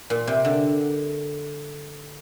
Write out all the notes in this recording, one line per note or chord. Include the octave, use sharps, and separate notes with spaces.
A#2
C3
D3